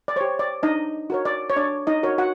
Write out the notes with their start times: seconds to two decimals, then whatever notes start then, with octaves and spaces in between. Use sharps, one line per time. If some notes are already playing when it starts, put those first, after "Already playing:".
0.08 D5
0.16 G4 C5 C#5
0.39 D5
0.63 D4 D#4 D#5
1.10 F#4 A#4 C#5
1.25 D5
1.50 C#5
1.57 D4 D5
1.87 D#4 D#5
2.03 F#4 A#4 C#5
2.18 F#4 F#5